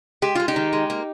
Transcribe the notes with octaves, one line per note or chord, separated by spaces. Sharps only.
G#3 G4
G#3 F4
D#4 G4
D#3
G#3
A#3